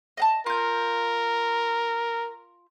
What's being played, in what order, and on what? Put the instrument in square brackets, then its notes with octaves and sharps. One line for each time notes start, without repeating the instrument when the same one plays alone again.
[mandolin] D#5 F#5 A5
[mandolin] F4 G6 [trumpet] A#4